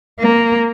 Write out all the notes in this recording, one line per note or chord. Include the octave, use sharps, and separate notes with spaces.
A#3